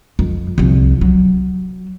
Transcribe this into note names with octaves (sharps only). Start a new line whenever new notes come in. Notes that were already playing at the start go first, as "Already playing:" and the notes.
F2
C2 F3
F#3